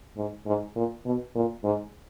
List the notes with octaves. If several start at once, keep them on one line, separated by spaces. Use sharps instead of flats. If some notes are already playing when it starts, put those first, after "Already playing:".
G#2
G#2
A#2
B2
A#2
G#2